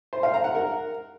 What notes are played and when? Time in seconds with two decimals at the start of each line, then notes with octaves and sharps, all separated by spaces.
0.13 C5
0.23 F5
0.34 A#5
0.44 F#5
0.55 A#4